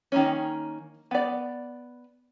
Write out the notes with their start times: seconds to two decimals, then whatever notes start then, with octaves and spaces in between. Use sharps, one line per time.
0.12 D#3 A#3 C#4
1.11 B3 D5